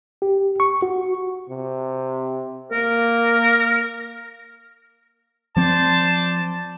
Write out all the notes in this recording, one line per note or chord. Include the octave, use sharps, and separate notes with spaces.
G4
C#6
F#4
C3
A#3 A#4
F3 C4 C5 D5 A5